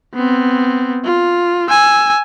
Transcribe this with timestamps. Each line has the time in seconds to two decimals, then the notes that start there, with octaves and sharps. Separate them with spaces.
0.14 B3 C4
1.05 F4
1.70 G#5 E6